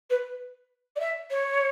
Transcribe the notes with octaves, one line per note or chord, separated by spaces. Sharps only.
B4
D5
E5
C#5